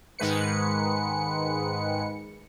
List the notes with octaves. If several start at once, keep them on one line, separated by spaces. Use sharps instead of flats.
G#2 D#3 G#3 B4 C#7